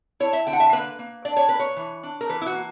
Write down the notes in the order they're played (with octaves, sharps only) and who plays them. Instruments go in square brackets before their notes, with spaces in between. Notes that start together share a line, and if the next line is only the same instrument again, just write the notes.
[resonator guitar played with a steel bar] E4 C#5
E5
D3 G5
F#5
E5
A#3 B4
A#3
D4 D5
C#5
A#3 B4
C#5
E3
D4
A#4
E3 B4
E4
F#4
A#3